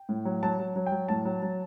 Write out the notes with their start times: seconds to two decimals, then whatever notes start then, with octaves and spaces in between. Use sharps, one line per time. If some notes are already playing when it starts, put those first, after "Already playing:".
Already playing: G5
0.09 A2
0.25 F#3
0.43 F#3 A5
0.59 F#3
0.76 F#3
0.86 G5
0.92 F#3
1.08 A2 A5
1.25 F#3
1.42 F#3